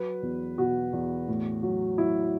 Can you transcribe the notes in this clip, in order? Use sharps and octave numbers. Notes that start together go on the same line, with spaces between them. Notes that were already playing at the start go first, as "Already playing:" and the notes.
Already playing: F#3 B4
E2
B2 F#4
E2
A2
F#3
F#3 E4